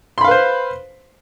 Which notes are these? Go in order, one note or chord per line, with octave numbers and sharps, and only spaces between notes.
B4 C5 F5 B5 C6